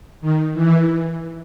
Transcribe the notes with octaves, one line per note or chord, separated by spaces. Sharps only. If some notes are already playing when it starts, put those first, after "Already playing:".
D#3
E3